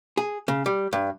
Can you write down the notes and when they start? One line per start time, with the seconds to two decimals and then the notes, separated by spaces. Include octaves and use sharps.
0.17 G#4
0.48 C#3
0.66 G3
0.93 G2